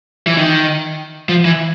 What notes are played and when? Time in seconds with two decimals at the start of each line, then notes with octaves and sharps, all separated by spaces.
0.27 E3
0.37 D#3
1.29 F3
1.45 E3